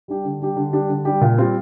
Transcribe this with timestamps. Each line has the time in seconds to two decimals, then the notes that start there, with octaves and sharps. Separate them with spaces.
0.08 G3 D4 G4
0.25 D3
0.41 G3 D4 G4
0.56 D3
0.73 G3 D4 G4
0.89 D3
1.05 G3 D4 G4
1.21 A#2
1.38 G3 C4 F4